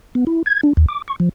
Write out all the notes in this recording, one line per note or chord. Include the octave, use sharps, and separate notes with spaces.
B3
E4
G#6
D4
D#2
D6
C#6
F3